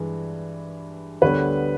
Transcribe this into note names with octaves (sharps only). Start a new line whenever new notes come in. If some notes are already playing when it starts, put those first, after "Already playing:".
Already playing: G2 E3 G#3
D2 D3 G3 B3 B4 C#5